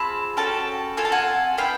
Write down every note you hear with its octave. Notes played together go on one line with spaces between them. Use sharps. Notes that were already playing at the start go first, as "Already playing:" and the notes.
Already playing: C4 F4 G#4 A5 B5
C#4 F#4 A4 G5 A5
C4 F4 A4 G#5
A5
F#5 G#5
B3 E4 F5 G5